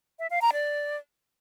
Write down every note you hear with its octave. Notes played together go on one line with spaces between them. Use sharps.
E5
F5
A#5
D5